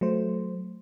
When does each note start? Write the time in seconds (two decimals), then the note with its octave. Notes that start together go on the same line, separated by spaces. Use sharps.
0.01 F#3 A3 C5